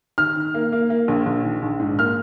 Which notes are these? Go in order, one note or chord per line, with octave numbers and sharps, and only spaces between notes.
D#3 F6
D#3
A#3
A#3
A#3
A#1
A#1
D#3
A#1
G#2
A#3 F6